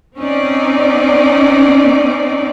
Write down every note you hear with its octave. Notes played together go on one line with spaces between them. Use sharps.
C4 C#4 D#4 D5